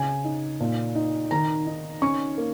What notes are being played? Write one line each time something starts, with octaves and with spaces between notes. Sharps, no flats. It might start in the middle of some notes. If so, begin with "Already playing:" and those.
Already playing: C#3 G#5
D#4
A#2
D#4
D#3 A#5
D#4
C#4 C#6
A#3